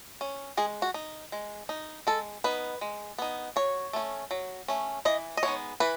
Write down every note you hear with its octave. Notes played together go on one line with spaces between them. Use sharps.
C#4
G#3 G#4
F#4
D#4
G#3
D#4
G#3 A4
B3 D#4 B4
G#3
B3 D#4
F#3 C#5
A3 C#4
F#3
A3 C#4
E3 D#5
D#5
G#3 B3 D#4 C#5
E3 B4